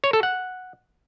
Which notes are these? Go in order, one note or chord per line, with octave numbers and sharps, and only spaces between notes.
C#5
A4
F#5